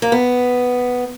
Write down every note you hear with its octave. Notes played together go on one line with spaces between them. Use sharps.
A#3
B3